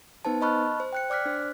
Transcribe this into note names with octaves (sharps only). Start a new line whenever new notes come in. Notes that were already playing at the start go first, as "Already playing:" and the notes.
B3 D#4 B4 C5 A5
D#5 A5 B5 C#6 F6 F#6
C5
G5 F#6 C#7
D5 D6 F6 F#6 B6
D4 C5